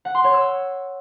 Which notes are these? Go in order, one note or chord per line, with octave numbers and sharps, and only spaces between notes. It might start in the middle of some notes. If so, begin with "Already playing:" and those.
F#5
C6
C#5
E6